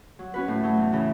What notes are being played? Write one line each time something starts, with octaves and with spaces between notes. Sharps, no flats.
F#3
C#4 F#4 B4
A2
F#3 A3
E2
C#3 E3